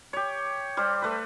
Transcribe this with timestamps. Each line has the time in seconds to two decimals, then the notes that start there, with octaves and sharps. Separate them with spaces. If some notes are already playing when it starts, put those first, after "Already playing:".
0.13 G4 C#5
0.77 G3 C5
1.02 A3 B4